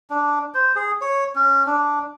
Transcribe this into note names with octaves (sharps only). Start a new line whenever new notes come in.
D4
C5
G#4
C#5
C#4
D4